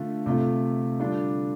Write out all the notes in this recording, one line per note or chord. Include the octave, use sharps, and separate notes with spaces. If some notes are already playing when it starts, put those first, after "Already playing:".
Already playing: D3 A3 F4
C3 A3 F4
D3 G3 D4 F4